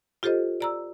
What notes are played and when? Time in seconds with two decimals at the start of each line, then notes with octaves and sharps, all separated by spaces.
0.23 F4 G4 A4 C5 D#5
0.60 D5 A#5 E6